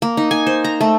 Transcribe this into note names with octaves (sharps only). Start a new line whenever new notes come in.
A#3
D#4
G#5
C5
A#5
A3